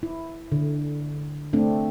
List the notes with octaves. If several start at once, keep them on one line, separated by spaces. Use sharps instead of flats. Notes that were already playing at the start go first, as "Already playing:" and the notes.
E4
D3
A3 C4 D4